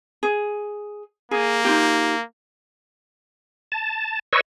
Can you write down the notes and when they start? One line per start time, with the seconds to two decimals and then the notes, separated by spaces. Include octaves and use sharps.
0.23 G#4
1.31 A#3 G#4
1.65 D#4 F4 G4
3.72 A5
4.33 B4 C#5 D#5 C#6 E6